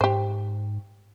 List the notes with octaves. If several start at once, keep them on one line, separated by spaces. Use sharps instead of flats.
G#2 G4 C5